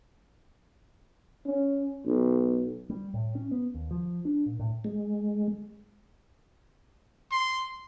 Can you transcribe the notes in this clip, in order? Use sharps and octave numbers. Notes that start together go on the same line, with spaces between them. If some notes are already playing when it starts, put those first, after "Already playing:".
C#4
B1
G3
A2
C#4
B3
D#2
F3
D4
A#2
A2
G#3
C6